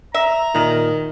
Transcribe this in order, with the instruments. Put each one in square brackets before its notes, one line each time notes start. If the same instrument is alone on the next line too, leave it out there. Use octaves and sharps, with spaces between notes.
[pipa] E5 [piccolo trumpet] A#5
[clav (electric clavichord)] A#2 A#4 [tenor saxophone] D#3